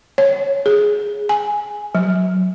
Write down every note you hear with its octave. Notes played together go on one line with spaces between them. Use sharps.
C#5
G#4
G#5
F#3